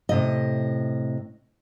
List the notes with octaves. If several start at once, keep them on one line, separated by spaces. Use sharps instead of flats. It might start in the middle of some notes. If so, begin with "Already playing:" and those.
A2 C3 D#5